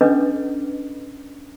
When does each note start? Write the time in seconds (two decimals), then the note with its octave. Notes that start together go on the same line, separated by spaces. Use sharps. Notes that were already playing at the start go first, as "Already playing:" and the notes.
0.01 C#4 D4 A4 B4 D#5 D6